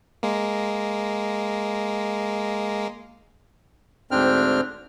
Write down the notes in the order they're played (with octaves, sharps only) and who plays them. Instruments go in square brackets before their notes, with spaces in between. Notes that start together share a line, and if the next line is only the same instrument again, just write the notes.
[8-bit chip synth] G#3 A#3
[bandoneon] D2 G#2 C4 D4 G5 F6